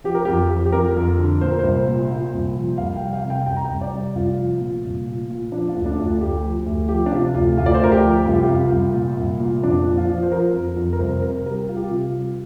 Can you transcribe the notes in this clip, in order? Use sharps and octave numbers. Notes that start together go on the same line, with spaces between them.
F3 G4
A#4
F2 G4
F3
G4
F2 A#4
F2
D3
A#2 C5
A#4
C2 C5
A#2
A#2
C2
F3
C2 F5
G5
G3
F5
C3
G5
C2 G5
A#5
G5
C2
D5
G3
C2 F4
F3
A#2
C2
A#2
A#2
F3 D4
F4
D2
D4
D2
F4
D2 G4
F3
D2
F3 G4
D4
C3 F4
D2 F4
D2 F4
D5
C5
D2 A#4
G4
F3
C2 F4
G4
C2 F4
C2
A#2
C2
A#2
F2 D4
F3
F4
F3
C5
F3 A#4
F2
F2
A#4
C2 C5
C3 A#4
G3 A#4
G3 F4
G4
F4
C3
G3